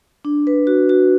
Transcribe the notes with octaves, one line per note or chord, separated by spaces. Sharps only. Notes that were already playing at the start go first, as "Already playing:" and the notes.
D4
B4
F#4
F#4